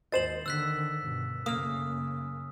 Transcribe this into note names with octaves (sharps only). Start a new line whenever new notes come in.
D#2 G#2 C5 D#5 A6 E7 F#7
D3 D#3 E6 F#6 B6
G2 B2
F#2 C#3 A#3 D#6 F6